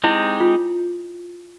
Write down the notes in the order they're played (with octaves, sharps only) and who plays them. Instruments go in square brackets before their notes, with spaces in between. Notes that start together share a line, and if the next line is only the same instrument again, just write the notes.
[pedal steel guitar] G#3 C4 D#4 G4 [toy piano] E4
[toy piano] F4